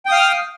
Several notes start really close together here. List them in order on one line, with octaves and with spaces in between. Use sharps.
G5 D#6 F5 F6